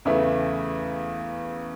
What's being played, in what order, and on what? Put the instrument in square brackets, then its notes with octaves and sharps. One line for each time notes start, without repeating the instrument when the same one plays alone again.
[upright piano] E2 C#3 E3 A3 E4